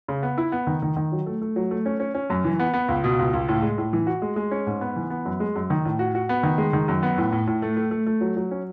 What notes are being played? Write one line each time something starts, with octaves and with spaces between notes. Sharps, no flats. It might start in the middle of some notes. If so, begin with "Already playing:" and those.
C#3
B3
E4
B3
D#3
D#3
D#3
F#3
A3
A3
F#3
A3
C#4
C#4
C#4
F#2
E3
B3
B3
C#2
B2
C#2
C#2
A2
G#3
A2
E3
F#4
G#3
G#3
C#4
G#2
B3
E3
B3
F#2
G#3
F#2
D#3
A2
F#4
F#4
B3
D#3
G#3
D#3
F#2
B3
A2
A2
A2
A3
A3
A3
A3
F#3
F#3
C#4